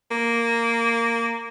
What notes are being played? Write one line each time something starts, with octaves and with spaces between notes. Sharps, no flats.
A#3